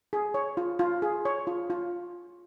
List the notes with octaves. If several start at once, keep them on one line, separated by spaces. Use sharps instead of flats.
G#4
C#5
F4
F4
G#4
C#5
F4
F4